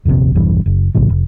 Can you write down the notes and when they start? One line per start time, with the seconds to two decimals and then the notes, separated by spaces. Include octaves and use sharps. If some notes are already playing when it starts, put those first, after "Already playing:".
0.05 F1 A#1 D#2 C3
0.35 E1 B1 G2 E3
0.66 F#1
0.95 B1 A2 C#3 F3
1.09 F1